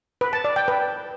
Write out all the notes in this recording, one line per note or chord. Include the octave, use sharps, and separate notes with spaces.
B4
A5
D5
G5
B4